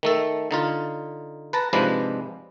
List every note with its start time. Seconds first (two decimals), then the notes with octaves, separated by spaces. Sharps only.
0.03 D#3 A3 A4
0.51 D3 D#4 F4
1.53 B4 A5 A#5
1.73 G#2 C3 F3 G#3 D4 B4